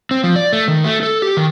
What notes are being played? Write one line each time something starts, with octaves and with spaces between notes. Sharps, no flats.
C4
F3
D5
A3
D#3
A3
A4
G4
D#3